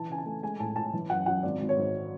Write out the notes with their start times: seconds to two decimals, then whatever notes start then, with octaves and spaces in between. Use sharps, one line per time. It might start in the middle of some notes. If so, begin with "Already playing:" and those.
Already playing: E3 A5
0.09 C#3 G#5
0.18 A5
0.26 A3
0.43 G#3 G#5
0.60 A2 A5
0.76 A2 A5
0.93 E3
1.10 F#2 F#5
1.26 F#2 F#5
1.43 G#1 D5
1.61 G#1
1.69 C#5
1.77 G#2